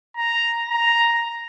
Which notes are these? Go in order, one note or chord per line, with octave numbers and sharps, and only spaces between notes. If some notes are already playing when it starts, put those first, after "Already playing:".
A#5
A#5